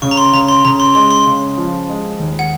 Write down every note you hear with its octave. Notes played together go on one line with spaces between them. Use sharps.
C#3 C#6
A#5
C6
C#3 A#5
C6
C#3 A#5
C6
G#3 C6
C6
C#3
F3
G#3
D#2
F#5